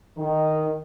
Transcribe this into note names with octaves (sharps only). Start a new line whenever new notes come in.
D#3